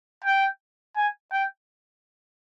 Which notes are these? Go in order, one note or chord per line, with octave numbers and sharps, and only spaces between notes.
G5
G#5
G5